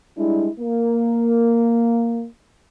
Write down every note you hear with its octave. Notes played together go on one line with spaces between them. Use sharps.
G3 G#3 D4 E4
A#3